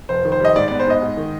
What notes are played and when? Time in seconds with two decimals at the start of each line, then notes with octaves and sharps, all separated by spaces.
0.09 F1 C5
0.25 D#3
0.32 C5
0.40 G3 D#5
0.56 G#2 D5
0.68 B3 D5
0.80 C5
0.87 G#2 D#5
1.02 G#2
1.17 D#3